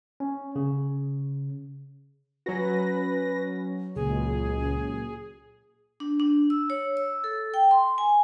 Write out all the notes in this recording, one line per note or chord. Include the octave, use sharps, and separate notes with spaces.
C#4
C#3
F#3 C#4 F#4 B4 A#6
C#2 A#2 G#4
D4
D4
E6
C#5
E6
A4
G5
C6
G#5